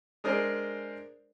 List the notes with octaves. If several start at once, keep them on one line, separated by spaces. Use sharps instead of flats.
G#3 D4 G#4 A#4 C5 D5